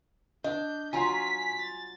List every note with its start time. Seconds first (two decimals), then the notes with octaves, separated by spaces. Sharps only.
0.44 D4 D#5 G6
0.93 F#3 F4 G#5 A#5 C6 B6
1.61 A6